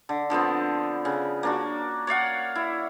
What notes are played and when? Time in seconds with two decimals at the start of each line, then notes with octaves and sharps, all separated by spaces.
0.09 D3
0.30 D3 F3 B3 C4
1.05 C#3
1.43 A#3 D4 F#4
2.07 C#5 D5 F5 F#5
2.55 E4